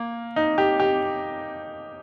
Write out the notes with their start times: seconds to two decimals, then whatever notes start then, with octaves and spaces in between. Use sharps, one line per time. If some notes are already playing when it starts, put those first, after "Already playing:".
Already playing: A#3
0.36 D#4
0.58 G4
0.80 G4